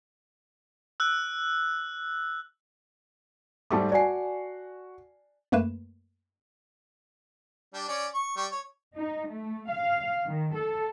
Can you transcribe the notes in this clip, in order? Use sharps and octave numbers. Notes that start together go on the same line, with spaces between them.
E6 F#6
G#2 G3 A3 A5 D6
F#4 D5 G#5 C7
F#2 A3 A#3 B4 E7
G3 D4
C#4 D5
C#6
G3 C#6
C#5
D#4
A3
F5
D#3
A4